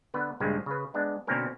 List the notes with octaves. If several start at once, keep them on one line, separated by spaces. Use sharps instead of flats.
D3 B3 B4
A#1 G2 C#3 F3 G#3
C#3 B4
G#3 B3 D4
B2 D3 A#3 C4 C#4 A#4